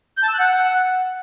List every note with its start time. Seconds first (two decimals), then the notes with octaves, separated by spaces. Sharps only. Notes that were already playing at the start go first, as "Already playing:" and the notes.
0.17 G6
0.23 A5
0.28 E6
0.34 F#6
0.39 F#5